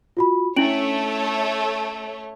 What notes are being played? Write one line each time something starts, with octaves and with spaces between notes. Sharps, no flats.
F4 F#4 B5
A3 C#4 D4 E4 C#5 D7 F#7